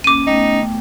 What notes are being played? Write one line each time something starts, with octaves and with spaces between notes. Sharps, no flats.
A#3 C#4 D6 D#7
A3 B3 D#4 G5